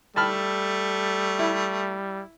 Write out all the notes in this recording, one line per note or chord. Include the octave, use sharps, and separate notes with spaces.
G3 A3 A5 B5 F6
E4